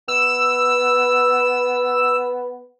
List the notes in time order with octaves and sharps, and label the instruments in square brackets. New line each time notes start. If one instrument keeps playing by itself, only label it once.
[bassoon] B3 [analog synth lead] E6